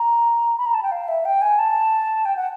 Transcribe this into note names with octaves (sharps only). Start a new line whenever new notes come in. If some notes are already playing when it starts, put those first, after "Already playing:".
Already playing: A#5
B5
A#5
A5
G5
F5
E5
G5
G#5
A5
G5
F#5